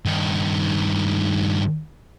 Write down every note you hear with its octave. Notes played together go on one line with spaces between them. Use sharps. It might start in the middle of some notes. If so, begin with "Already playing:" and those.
G2 D#3